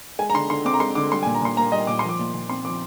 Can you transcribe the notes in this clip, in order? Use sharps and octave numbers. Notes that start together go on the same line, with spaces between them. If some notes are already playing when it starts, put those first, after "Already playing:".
G#3 G#5
A#5
D3 C6
D3 C6
C4 D6
A#5
G#3 C6
D3 D6
G3 C6
G#5
A#2
A#5
A#2 C6
A#3 A#5
G3 D#5
A#2 D6
F3 C6
D6
A#2
A#2
C4 C6
F3 D6